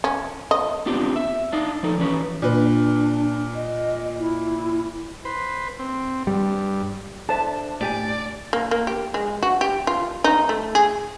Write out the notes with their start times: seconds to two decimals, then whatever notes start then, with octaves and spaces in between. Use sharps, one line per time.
0.04 C#4
0.51 D#5
0.86 B3 C4 D4 F4 G4
1.16 E5
1.53 D4 D#4 F5
1.83 F3 D#4 A4
1.98 E3 C#4 B4 C#5
2.42 A#2 D4 B4
3.55 D#5
4.19 E4
5.25 B4 C5
5.79 C4
6.27 G2 G3
7.29 D4 A4 C5 E5 A5
7.81 A2 G4 D5 G#5
8.53 A#3
8.71 A#3
8.87 G4
9.14 G#3
9.43 F#4
9.61 G4
9.87 F4
10.24 D#4
10.49 A3
10.75 G#4